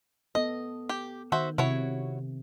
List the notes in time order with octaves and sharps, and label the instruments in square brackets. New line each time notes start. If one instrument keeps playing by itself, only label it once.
[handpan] B3 A4 [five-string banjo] D#5
[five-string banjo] G4
[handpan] D#3 [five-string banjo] F#4 C5 E5
[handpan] C3 [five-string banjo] E4 F#4 C#5